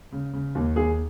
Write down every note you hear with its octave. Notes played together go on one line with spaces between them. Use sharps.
C#3
C#3
D#2
D#2 G#4